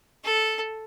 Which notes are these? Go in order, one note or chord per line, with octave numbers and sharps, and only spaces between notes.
A4